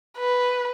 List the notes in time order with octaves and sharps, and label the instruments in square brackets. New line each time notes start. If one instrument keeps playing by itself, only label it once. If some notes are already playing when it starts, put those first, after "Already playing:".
[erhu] B4